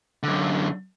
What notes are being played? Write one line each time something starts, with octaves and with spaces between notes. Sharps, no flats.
F#2 D3